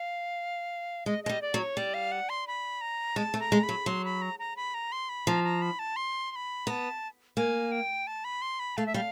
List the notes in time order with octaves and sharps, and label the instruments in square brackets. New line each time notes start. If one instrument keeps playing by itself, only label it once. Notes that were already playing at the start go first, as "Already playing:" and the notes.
Already playing: [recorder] F5
[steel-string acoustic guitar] G#3 [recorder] D#5
[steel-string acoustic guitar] G#3 [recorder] D#5
[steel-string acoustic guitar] G3
[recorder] D5
[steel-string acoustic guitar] F#3
[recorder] C#5
[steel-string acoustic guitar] G3 [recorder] D5
[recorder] F5
F#5
C6
B5
A#5
[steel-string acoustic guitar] G#3 [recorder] A5
[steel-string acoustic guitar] A3
[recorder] A#5
[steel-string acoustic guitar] G#3
[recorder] B5
[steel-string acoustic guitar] F#3
[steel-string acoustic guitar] F#3 [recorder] C6
[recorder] B5
A#5
A#5
B5
A#5
C6
B5
[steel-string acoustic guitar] F3 [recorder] A#5
[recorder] A#5
B5
A5
C6
C6
B5
[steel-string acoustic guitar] B3 [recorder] A#5
[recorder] A5
[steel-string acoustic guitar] A#3 [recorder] G#5
[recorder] G5
A5
B5
C6
B5
[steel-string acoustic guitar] A3 [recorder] F5
[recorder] E5
[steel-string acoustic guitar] G3 [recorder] F5